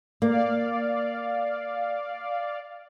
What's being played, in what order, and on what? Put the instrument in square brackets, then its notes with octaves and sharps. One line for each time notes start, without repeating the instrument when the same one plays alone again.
[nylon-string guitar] A#3 [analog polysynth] D5 F5